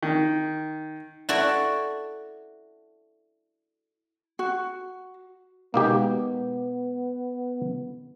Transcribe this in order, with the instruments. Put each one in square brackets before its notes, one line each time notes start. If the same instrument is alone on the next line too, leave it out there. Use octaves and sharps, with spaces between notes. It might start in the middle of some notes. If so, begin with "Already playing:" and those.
[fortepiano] D#3
[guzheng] E4 F#4 A4 D5
[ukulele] F#4
[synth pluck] B2 G#3 [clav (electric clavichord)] A#3 D#4 G4 [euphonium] B3